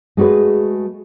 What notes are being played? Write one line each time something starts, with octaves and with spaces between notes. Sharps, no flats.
G#3 A3 F#4 G#4 B4